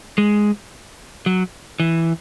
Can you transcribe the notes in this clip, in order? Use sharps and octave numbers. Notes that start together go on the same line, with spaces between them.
G#3
F#3
E3